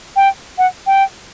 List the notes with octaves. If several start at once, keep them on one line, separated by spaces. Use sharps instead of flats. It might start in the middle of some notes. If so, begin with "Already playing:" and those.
G5
F#5
G5